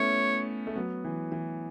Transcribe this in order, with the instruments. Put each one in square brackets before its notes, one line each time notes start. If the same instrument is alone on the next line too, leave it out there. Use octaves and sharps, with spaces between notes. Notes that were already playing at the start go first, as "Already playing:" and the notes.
Already playing: [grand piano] A3 B3 C#4 E4 [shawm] C#5
[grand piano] A3
F#3 B3
E3
E3